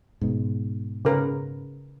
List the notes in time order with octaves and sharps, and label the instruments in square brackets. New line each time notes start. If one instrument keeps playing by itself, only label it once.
[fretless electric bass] G#2 B2
[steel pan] C#3 A#4 B4